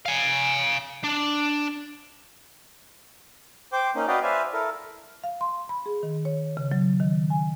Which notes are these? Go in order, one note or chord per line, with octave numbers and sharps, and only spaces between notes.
F5 G#5
D4
C5 G5 D6
A#3 C#4 D#4
F#4 B4 D5 D#5 F5 G5
B4 C5 D5 E5 F5 G#5
E4 A4 A#4
F5
C6
B5
G#4
D#3
C#5
C#3
F#3
D#3
G#5